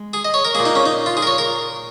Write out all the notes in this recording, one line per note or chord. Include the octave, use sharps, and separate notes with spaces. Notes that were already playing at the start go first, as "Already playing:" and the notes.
Already playing: G#3
G#4
D#5
C#5
A#4
A#2 A#3 G#4
D#4
C#4
D#4
F4
G#4
A#4
C#5
A#4